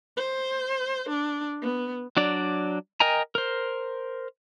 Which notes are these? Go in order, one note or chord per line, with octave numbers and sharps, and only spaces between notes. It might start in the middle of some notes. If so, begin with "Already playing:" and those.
C5
D4
B3
F#3 D4 D5
A#4 D#5 G5 G#5 A#5
A#4 C5